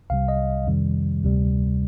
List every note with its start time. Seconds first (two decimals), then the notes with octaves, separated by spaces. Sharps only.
0.10 C2 C3 G3 F5
0.28 D#5
0.67 F2 C3 D#3 G3
1.23 D2 C3 G3